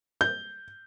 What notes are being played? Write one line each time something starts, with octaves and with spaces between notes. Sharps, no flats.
G6